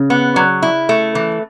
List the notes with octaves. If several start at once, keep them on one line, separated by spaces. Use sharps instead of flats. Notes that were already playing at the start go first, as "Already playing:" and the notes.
Already playing: C#3
B3
F#3
E4
A3
E3